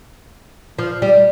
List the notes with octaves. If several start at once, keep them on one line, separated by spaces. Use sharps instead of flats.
F3
G3